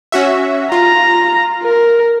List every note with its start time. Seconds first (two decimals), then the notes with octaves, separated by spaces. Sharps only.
0.12 C#4 F#4 E5
0.72 F4 A#5
1.63 A#4